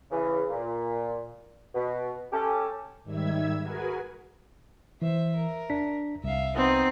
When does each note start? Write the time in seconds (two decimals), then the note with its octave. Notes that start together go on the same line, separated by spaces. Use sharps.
0.11 C#3 E3
0.49 A#2
1.74 B2
2.32 C#4 G4 A4
3.03 G#2 D#3 G3 E5 E6 G#6
3.61 F#4 G#4 A#4 B4 G#5
5.02 E3 C5 E5
5.36 A#4
5.70 D4 B6
6.24 C2 E5 F5
6.56 B3 C4 D#4